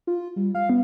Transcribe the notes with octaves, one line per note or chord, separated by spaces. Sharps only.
F4
G3
F5
B3